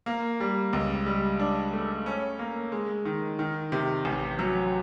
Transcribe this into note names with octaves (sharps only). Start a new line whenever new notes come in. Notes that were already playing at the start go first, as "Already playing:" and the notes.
A#3
G3
C#2
G3
D4
A3
C#4
A#3
G#3
D#3
D#3
C3
A1
F#3